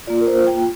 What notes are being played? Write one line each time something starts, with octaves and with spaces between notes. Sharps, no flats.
A#3 F4 D5
A#4
C5
G5